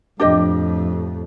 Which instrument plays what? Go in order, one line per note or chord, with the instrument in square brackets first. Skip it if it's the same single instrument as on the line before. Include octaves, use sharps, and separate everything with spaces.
[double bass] F2 A2 [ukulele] D4 G4 D#5